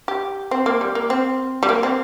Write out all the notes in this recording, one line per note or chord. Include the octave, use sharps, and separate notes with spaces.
G4
C4
A#3
G3
A#3
C4
G3
A#3
C4